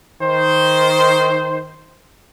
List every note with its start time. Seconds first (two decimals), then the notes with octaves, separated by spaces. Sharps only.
0.22 D#3 C5